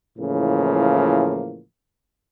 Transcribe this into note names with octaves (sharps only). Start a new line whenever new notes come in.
A2 C#3 E3 F3 A#3